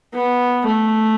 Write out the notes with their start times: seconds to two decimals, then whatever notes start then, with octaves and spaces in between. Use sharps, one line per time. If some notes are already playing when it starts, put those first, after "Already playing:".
0.14 B3
0.66 A3